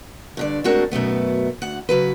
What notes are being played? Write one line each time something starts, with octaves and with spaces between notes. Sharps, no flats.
G2 D3 D5
G#3 A3 C4 D4 F#4 A#4
F#2 B2 A3 B3
D2 F#5
C#3 E3 F#3 B4